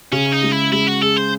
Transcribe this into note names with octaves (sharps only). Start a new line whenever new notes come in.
C#3 C#4
D#4
G#3
E4
G#3 E4
F#4
G#4 A4
C5